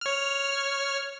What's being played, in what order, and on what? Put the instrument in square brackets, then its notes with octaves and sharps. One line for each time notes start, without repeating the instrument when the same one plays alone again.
[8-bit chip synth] C#5 F6